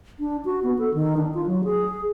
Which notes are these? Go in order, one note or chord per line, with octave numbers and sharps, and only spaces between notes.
D4
F#4
B3
A4
D#3
D4
F4
F#3
G#4